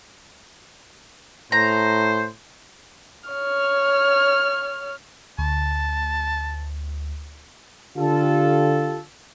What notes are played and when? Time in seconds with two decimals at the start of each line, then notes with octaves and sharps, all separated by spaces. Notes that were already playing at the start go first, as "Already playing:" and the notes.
1.52 A2 C5 A#5
3.30 C#5 F6
5.38 D2 A5
7.97 D3 F4 G4 A4